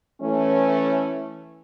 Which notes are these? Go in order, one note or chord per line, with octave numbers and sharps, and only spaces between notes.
E3 A3 C#4